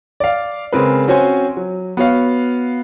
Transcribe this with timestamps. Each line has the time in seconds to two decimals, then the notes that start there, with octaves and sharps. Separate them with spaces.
0.20 D5 F5
0.73 C#3 G#3 C4 G#4 A#4 B4
1.07 C4 C#4 F#4 C5 C#5 G#5
1.57 F#3
1.97 B3 F#4 C#5 F5